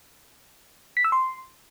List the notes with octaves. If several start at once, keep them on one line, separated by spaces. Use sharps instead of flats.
B6
E6
C6